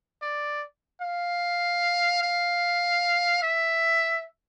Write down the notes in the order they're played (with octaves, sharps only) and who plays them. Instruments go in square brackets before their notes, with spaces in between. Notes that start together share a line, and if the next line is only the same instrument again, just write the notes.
[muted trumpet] D5
F5
F5
E5